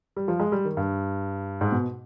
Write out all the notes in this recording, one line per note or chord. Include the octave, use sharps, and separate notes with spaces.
G3
F3
G#3
G3
D#3
G2
G#2
B2